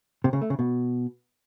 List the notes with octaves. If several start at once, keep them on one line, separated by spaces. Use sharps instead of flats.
C3
C#3
A3
C#3
B2